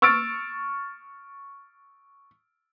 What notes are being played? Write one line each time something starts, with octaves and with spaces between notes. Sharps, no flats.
C#6 E6 F6 A6 D7